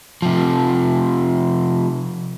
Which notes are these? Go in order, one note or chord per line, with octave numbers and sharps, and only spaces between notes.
C3 F3